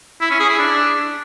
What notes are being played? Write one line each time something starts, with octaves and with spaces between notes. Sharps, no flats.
E4
C#4
G#4
E4
D4